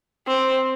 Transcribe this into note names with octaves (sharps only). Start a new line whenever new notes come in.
C4